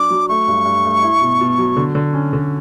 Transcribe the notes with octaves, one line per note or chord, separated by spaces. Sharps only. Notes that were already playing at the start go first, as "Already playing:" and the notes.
Already playing: F#3 D4 D6
F#3
A3 C#6
G2
G2
A3
E4
B2
B2
F#3
D3
D3
C#4
D3